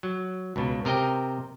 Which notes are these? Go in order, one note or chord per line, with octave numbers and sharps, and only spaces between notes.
F#3
C#2 B2
C3 A#4 D#5 G5